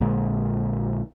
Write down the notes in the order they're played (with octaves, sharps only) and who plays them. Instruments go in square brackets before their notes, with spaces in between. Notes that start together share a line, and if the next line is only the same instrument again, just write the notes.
[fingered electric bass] A#1 A#2 D3 G#3